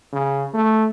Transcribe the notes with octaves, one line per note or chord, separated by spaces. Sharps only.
C#3
A3